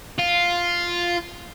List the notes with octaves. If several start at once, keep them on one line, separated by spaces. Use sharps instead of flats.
F4